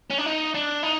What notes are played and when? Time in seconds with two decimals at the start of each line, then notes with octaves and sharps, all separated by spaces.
0.10 C#4
0.18 D4
0.26 D#4
0.54 D4
0.83 D#4